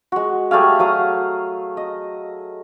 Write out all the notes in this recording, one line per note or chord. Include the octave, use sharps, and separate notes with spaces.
G#3 F#4
G3 A3 G#4 F5
F#3 F5 D#6
D#5